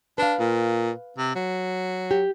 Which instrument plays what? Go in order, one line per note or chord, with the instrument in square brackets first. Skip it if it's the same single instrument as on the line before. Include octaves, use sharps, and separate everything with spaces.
[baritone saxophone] D4 [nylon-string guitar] B4 F5
[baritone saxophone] A#2
C3
F#3
[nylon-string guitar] G4